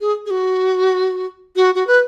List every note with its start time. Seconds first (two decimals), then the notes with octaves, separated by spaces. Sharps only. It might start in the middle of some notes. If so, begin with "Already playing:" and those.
0.01 G#4
0.26 G#4
0.30 F#4
1.56 F#4
1.75 F#4
1.87 B4